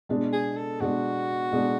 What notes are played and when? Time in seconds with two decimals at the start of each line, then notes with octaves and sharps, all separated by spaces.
0.09 B2 G#3 D4
0.33 G#4
0.56 A4
0.80 B2 G#3 D4 F#4
1.52 B2 G#3 D4